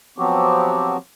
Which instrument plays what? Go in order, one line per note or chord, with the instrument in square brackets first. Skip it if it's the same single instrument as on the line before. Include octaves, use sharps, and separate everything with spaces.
[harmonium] F3 F#3 B3 C4 F#4 G4